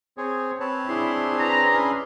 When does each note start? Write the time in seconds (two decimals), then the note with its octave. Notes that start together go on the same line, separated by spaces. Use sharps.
0.18 C4 G#4 C#5
0.60 C4 B4 C#5 A5
0.89 D4 E4 G#4 C6
1.39 B4 A#5
1.74 C#4 E4 G#5